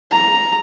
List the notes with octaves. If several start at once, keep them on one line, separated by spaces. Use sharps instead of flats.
A#5